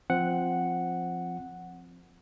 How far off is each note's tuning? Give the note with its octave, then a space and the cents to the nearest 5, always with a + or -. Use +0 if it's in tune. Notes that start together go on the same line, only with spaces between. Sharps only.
F3 +0 C4 +0 F#5 +0